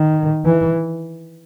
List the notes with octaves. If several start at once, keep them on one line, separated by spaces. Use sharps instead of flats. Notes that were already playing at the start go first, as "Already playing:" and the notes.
Already playing: D#3
E3